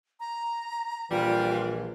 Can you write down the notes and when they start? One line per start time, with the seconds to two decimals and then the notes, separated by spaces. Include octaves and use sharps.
0.20 A#5
1.11 A#1 E3 G3 F4